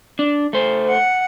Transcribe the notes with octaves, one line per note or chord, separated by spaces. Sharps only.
D4
A3 C5
F#5